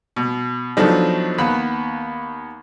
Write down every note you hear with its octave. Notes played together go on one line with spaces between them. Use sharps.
B2
F3 F#3 A3 B3 D4 D#4
D#2 B3 B5 F#6